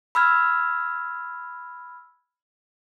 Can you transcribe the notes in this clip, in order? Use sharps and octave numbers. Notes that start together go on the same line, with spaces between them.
B5 E6 F6 G#6